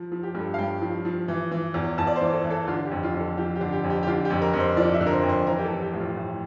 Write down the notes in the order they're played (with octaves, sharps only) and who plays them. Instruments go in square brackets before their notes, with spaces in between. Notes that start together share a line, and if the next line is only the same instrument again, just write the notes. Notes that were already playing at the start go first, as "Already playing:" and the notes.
Already playing: [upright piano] F3
F3
G4
G2
A4
F5
G2 G5
F3
F3
E3
E3
E2
E2 A5
D5
C5
E3
A4
E3
A4
D3 F4
G4
F2
F4
F2
A4
F3 G4
G4
D3
G4
F2
G4
G4
D3 F4
G4
F2
A#4
F2
C5
F3 D5
E5
D3
A#4
C5
F2
C5
E3 A#4
G4
A4
E3
G4
A2
F4
A2